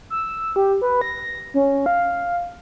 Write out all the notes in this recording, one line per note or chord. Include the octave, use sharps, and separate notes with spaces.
E6
G4
B4
A#6
C#4
F5